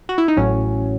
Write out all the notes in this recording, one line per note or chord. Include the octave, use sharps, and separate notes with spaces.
F#4
E4
D#4
A1 A2 F#3 C#4